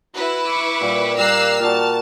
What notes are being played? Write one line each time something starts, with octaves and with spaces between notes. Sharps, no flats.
E4 F#4 B4
C#6 D6
A#2 G3 F5
G3 A#3 G4 F5 A#5 E6 F#6 C7
A#2 F#4 A5 F6